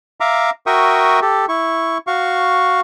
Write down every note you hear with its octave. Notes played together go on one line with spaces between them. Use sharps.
E5 F5 A#5 D6
F#4 A#4 E5 G5 C#6 D#6
G4 A4
E4 C#6
F#4 F5 C#6